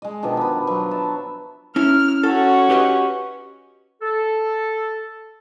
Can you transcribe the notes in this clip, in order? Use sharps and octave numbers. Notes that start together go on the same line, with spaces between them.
G#3 D#5
B2 D#3 F3 D4
B3 B4
F3 F#3 B3
E5 A5
C#4 E4 F6
C#4 F#4 A4
G4 B4 D#5
A4